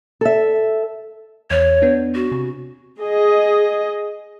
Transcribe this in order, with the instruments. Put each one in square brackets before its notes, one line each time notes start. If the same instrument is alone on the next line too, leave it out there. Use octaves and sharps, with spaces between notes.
[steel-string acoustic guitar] A4 E5
[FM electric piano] E2 [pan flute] C#5
[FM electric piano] B3 D4
[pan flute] F#4
[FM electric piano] C3
[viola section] G#4 D#5